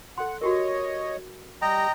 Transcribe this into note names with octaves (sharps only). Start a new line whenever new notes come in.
A4 F#5 C6
F#4 G4 A#4 C#5 D#5
G3 D#5 G5 A#5